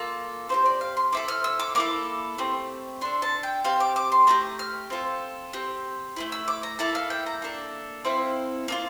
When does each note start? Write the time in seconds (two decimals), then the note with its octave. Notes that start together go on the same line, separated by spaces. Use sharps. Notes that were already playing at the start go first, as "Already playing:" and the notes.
Already playing: A#3 F4 A4
0.49 C4 E4 G4 C5
0.66 D5
0.81 F5
0.97 C6
1.12 C4 E4 A4 D6
1.28 F6
1.44 E6
1.60 D6
1.75 A#3 E4 A4 D6
2.38 A3 C4 G4
3.01 D4 A4 C6
3.22 A5
3.43 G5
3.64 C4 G4 F5
3.80 D6
3.96 D6
4.12 C6
4.27 A3 D4 G4 A#5
4.59 F6
4.90 C4 F4 A4
5.53 C4 G4
6.16 A3 C4 E4
6.32 E6
6.48 D6
6.63 A#5
6.79 A#3 E4 A4 A5
6.95 F5
7.10 G5
7.26 A#5
7.42 A#3 D4 A4
8.05 C4 E4 A4 F5
8.68 A#3 D4 F4